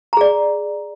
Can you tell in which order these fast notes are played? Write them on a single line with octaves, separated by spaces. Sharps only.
A#5 G#4 D5